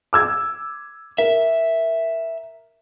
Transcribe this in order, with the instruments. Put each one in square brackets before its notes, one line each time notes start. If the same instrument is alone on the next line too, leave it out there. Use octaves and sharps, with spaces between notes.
[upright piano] D6 E6 G#6
[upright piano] A#4 [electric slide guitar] E5